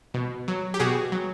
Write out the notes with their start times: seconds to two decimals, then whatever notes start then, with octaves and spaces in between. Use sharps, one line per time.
0.14 B2
0.48 F#3
0.74 G4
0.80 B2 F#4 G#4
1.12 F#3